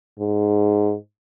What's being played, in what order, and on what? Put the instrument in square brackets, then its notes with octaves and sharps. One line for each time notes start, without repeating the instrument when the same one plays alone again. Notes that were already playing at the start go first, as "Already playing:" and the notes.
[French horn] G#2